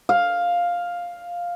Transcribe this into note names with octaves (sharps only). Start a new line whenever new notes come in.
F5